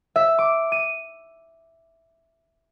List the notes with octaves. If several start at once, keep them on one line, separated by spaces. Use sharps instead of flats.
E5
D6
D#7